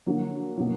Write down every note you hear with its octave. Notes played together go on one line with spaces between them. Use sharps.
D3 F#3 A#3
B2 F#3 A#3